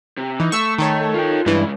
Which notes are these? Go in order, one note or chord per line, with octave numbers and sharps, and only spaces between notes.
C3
E3 D#4
A3 C#6 E6
D#3 A4 C#5
F4 G5
G2 C#3 E3 G#3